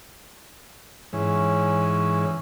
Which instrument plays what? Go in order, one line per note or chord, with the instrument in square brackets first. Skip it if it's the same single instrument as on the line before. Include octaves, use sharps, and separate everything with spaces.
[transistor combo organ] G#2 E3 [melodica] C#4